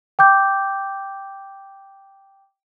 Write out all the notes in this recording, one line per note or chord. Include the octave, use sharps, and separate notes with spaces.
G5 D6 G6